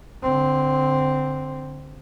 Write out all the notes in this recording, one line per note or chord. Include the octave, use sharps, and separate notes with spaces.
D3 C4